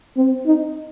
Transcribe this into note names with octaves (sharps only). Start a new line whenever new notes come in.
C4
D#4